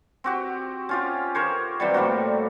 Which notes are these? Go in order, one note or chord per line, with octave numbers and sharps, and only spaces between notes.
C4 F#4 G4
C#4 F4 G4
G4 A#4 C5 C#5
C3 E3 F#3 G3
A2 G3 A#3 F#4